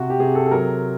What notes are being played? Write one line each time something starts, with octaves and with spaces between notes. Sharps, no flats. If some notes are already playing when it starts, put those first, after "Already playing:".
Already playing: C3 F#4
G4
C3 G#4
A4
A4
F#3 A#4